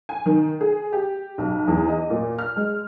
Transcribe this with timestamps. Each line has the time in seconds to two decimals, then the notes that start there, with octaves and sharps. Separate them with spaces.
0.09 G#5
0.26 D#3
0.61 G#4
0.93 G4
1.38 B1
1.67 E2
1.88 D#5
2.10 A#2
2.38 F6
2.56 G#3